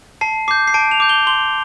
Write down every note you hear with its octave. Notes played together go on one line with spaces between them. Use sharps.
A5 C7
D6 G6 C7
C7
A5 D7
F7
D6 G6
G7
C6 G7